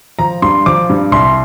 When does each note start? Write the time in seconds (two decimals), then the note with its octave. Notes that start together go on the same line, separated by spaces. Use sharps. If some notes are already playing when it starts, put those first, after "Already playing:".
0.19 F3 A#5
0.42 G2 C6
0.66 F3 D6
0.90 G2
1.12 C2 C6